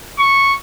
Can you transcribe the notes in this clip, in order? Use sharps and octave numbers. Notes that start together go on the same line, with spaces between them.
C#6